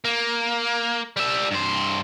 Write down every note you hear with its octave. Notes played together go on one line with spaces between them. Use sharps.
A#3
G3 E5
G2 C5